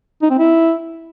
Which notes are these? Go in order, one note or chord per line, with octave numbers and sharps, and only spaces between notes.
D#4
C4
E4